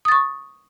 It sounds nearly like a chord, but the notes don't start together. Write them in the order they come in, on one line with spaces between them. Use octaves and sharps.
D#6 A6 C#6